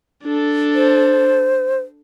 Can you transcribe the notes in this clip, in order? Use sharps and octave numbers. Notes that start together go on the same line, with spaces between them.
D4 A4
C5